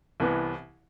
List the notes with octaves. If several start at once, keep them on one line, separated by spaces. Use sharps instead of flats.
C2 C3 E3 B3